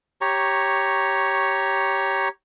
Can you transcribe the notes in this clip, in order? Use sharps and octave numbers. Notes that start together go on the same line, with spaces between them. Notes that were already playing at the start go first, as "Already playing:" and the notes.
G4 C#5 A#5 C#6